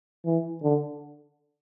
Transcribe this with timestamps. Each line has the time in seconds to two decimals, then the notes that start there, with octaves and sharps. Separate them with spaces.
0.26 E3
0.63 D3